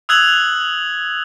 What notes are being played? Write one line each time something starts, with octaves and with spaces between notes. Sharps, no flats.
D#6 E6 F#6 G#6 F7 F#7